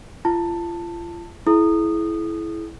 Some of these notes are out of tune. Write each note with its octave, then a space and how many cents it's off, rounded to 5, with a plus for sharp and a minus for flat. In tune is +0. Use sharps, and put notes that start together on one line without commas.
F4 -35 A5 +15
E4 +0 G#4 +45 D#6 -20